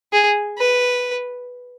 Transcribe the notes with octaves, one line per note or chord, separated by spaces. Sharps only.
G#4
B4